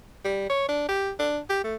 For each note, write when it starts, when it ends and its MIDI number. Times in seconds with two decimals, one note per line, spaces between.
0.25 0.46 55
0.50 0.68 73
0.69 0.85 62
0.89 1.11 67
1.19 1.39 62
1.50 1.64 67
1.64 1.75 57